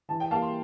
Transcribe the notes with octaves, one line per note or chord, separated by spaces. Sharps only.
E3 A5
G5
G3 A#3 F5 A5
C6